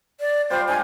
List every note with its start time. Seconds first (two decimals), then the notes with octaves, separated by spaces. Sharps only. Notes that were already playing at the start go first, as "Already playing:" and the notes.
0.20 D5
0.50 G3 F4 C5 G5
0.68 G#3 D4 F4 G#5